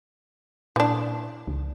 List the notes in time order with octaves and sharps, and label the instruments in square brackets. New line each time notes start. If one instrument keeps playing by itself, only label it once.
[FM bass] A#2 [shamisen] E3 D4
[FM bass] C#2